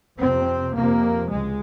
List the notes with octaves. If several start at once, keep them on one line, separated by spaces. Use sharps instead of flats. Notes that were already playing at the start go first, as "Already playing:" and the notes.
F2 C3 C4
F2 C3 A#3
C#2 G#3